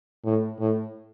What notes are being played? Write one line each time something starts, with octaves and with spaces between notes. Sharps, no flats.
A2
A2